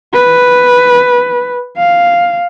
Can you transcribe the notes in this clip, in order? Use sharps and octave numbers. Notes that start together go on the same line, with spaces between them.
B4
F5